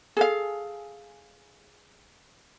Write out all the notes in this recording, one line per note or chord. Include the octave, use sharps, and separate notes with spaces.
G#4 A4 F5